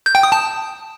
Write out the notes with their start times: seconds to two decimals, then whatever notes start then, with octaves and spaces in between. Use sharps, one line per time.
0.06 G6
0.15 G5
0.23 D#6
0.32 A5